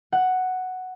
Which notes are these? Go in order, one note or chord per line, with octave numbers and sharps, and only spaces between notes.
F#5